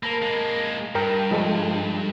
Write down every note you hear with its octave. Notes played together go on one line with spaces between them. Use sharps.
A#3 A#4 A5 B5
G#3 A#3
G2 A#4 G5 A#5
F3 G#3 A4